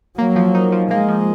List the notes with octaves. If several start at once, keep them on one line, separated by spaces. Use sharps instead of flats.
F#3 A#3
F3
D#4
F3
G#3 A#3
F3